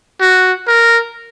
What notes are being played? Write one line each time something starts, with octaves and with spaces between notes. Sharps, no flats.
F#4
A#4